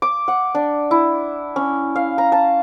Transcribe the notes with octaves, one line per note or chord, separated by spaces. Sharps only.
D6
F#5
D4
E4
C#4
F5
A#5
A5